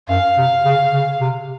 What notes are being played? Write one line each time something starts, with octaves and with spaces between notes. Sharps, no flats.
F#2 F5
C3
C#3
C#3
C3